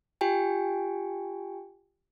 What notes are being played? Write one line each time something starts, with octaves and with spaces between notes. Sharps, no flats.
F4 G4 G5 G#5